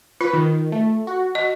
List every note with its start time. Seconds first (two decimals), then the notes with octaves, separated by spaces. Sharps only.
0.21 F4 B4
0.33 D#3
0.72 A3
1.07 F#4
1.35 D#5